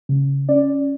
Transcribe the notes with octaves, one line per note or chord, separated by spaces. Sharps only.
C#3
C#4 D5